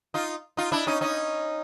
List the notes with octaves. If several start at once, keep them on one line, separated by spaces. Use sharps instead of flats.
D#4 F4
D#4 F4
D4 E4
C#4 D#4
C#4 D#4